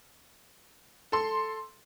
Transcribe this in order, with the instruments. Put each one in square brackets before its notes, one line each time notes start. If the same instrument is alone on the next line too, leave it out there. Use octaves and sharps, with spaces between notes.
[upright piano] A4 C6